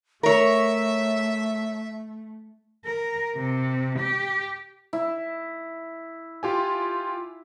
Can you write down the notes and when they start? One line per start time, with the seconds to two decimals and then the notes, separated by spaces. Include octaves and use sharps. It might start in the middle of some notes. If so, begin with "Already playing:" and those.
0.23 A3 A#4 C#5 E5
2.85 A#4
3.36 C3
3.99 G4
4.93 E4
6.43 F4 G4 G#5